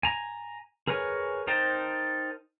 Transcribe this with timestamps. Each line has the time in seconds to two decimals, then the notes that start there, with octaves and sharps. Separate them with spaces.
0.03 G#5 A#5
0.88 G#4 A#4 B4 C#5 G#5
1.47 D#4 A#4 C5 G5 A5